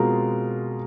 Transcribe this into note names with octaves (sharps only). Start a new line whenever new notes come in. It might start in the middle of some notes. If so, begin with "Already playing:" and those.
Already playing: B2 G#3 C4 F4 A#4